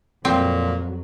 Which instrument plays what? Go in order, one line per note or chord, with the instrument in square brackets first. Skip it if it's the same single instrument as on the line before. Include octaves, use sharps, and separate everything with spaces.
[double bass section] F2 F#3 [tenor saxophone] A#2 [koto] C4